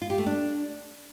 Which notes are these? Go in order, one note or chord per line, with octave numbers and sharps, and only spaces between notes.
F4
G4
A3
D4